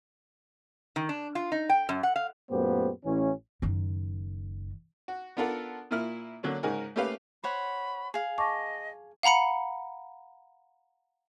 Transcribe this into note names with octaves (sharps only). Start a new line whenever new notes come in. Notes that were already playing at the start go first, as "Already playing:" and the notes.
D#3
D4
F4
D#4
G5
F#2
F#5
F5
F#2 A#2 A3 B3 G4 C5
A1 E3 C#4
F#1 D#3
F#4
B3 D4 F4 A4 A#4 F#5
A#2 A#3 E4 F6
D3 F#3 A#3 C#4
G#2 C#3 D#4 F#4 A#4 G#5
A3 A#3 C#4 G4 B4 F5
C5 C#5 F#5 B5
G#4 F5
D#5 A5 C#6 D6
F5 F#5 A#5 B5 C#7